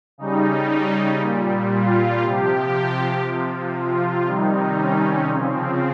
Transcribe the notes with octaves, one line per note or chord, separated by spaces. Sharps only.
C#3 G3 D#4
A#2 G3
F4
C3 F3 G4
C3 F3
F4
C3 D#3 G3 D#4
C#4
C#3 F3 C4